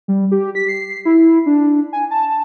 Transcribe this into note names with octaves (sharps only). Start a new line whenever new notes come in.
G3
G4
B6
C7
E4
D4
G#5
A5